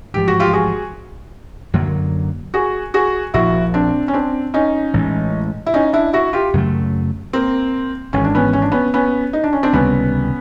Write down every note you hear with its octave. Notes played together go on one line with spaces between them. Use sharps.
A1 G#2 F3 G4
F#4
F4 G4
F#4 G#4
F#2 D3 F#3 A#3
F#4 G#4
F#4 G#4
A#1 A#2 F3 E4 F#4
C4 D4
C#4
C4 D4
C#4 D#4
A1 A2 E3 G#3
E4
C#4 D#4
D4 E4
E4 F#4
F4 G4
F#2 C#3 F#3 A3
A#3 C4
G#1 G#2 E3 C#4
D4
B3 C#4
C#4
D4
B3 C#4
B3 C#4
D#4
D4
C#4
C4 D4
C#2 C3 D#3 G3 B3 C#4